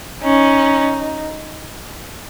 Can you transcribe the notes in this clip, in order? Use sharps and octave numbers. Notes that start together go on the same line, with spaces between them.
C#4 D#4